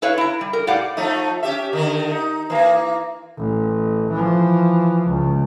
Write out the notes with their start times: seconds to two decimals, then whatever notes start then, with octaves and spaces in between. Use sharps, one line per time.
0.02 E4 B4 C#5 F5
0.18 E4 A#5
0.41 G3
0.53 A#4
0.67 A2 G4 D5 F5 F#5
0.97 F3 A3 D#4
1.43 C#4 G4 E5
1.73 D3 D#3 A#4
2.11 D#4
2.50 E3 A#3
3.38 A1
4.12 E3 F3
5.07 C#2